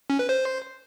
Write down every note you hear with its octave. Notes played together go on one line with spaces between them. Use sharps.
C#4
B4
C5